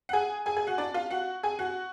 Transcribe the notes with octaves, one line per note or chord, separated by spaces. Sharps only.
F#5
G#4 G#5
G#4 G#5
G#4 G#5
F#4 F#5
D4 D5
F4 F5
F#4 F#5
G#4 G#5
F#4 F#5